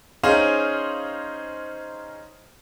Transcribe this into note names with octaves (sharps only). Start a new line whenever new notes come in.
C#4 D#4 G#4 C5 F5